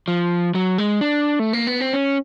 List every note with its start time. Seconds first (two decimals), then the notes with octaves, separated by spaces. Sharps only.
0.08 F3
0.55 F#3
0.78 G#3
1.01 D4
1.39 A3
1.53 A#3
1.67 B3
1.81 C4
1.93 C#4